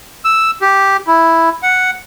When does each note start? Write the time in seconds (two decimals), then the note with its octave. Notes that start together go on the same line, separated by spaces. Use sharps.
0.25 E6
0.61 G4
1.07 E4
1.63 F#5